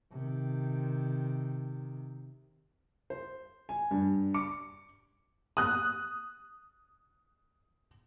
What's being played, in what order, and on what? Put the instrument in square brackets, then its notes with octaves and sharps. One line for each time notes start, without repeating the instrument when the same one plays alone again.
[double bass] C3 D#3
[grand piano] C5
G#5
G2
D6 C#7
[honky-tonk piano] D#6 F#6